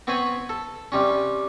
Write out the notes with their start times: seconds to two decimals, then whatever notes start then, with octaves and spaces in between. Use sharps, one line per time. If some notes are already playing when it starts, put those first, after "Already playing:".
0.07 B3 C4 C5 C#5 G#5 B5
0.49 A4
0.92 C3 G3 C#4